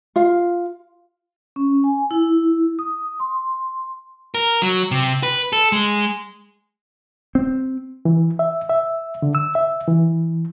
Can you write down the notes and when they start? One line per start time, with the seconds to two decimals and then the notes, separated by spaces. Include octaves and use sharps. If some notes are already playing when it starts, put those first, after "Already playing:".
0.16 F4 F5
1.56 C#4
1.84 G#5
2.11 E4
2.79 D#6
3.20 C6
4.35 A#4
4.62 F#3
4.91 C3
5.23 B4
5.53 A4
5.72 G#3
7.35 C4
8.05 E3
8.39 E5
8.69 E5
9.22 D3
9.35 E6
9.55 E5
9.88 E3